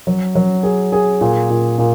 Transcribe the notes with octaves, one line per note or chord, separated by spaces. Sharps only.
F#3
F#3
G#4
G#4
A#2
A#2
A#2